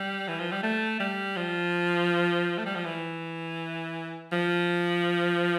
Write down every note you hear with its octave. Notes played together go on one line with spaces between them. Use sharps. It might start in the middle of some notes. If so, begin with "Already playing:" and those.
Already playing: G3
E3
F3
G3
A3
G3
F3
A3
G3
F3
E3
F3